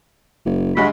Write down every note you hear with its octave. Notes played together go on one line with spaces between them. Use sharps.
F#1
D2 G2 G#3 F#4 B5